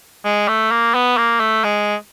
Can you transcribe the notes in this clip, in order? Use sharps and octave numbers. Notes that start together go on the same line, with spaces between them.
G#3
A3
A#3
B3
A#3
A3
G#3